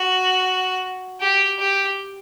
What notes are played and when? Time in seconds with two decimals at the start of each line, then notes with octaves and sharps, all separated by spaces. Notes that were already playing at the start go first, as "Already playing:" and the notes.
Already playing: F#4
1.20 G4
1.59 G4